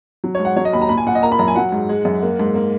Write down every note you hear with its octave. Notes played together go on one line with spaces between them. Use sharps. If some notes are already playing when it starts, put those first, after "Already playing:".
F#3
C#5
G#2
F#5
F#3 C#5
D#5
D#2 B5
A#5
A#2 B5
G#5
A#2 F#5
D#5
A#3 A#5
B5
F#2 A#5
G#5
F#3 F#5
G#2
G#3
F#2
A#3
G#2
A#3